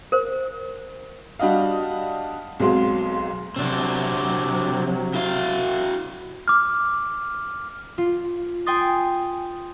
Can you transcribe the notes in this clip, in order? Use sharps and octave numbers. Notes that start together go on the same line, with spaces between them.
A#4 C5
G3 D4 F#4 D#5 F5
B1 F#3 G#3 C4 F5 C6
C3 F#3 C4 D4 F#4
E4 F#4 F5
D6 F6
F4
G5 G#5 C6 D#6 A6